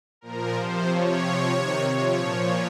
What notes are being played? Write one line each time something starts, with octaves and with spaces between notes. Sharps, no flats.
A#2 F3 A#4
C3 F3 C5
C3 F3 C#5
C3 F3
C3 D#3
C3 F3 C#5
A#2 F3